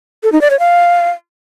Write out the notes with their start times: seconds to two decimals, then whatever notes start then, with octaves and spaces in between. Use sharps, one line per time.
0.23 A4
0.32 D#4
0.41 D5
0.50 C#5
0.59 F5